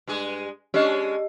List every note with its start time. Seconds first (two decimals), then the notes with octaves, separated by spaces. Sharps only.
0.07 G2 G#3 G#4
0.74 G#3 C#4 D4 G4 D#5